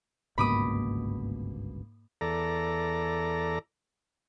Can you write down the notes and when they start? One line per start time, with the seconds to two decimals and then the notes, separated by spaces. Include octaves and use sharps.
0.38 G1 C#2 G#2 B2 A#3 B5 D6 D#6
2.21 E2 A4 D5 A#5